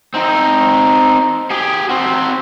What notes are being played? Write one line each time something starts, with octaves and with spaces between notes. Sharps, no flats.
C4 D#4
G4 G#4
C4 F#4